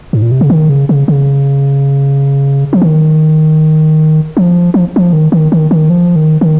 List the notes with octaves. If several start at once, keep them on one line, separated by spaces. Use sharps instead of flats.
G#2
A#2
C3
C#3
D#3
C#3
C#3
C#3
F3
D#3
F3
F3
F3
D#3
D#3
D#3
D#3
F3
D#3
D#3